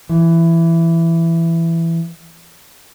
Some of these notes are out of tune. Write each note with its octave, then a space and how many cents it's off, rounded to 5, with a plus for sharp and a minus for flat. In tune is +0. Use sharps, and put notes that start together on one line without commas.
E3 +10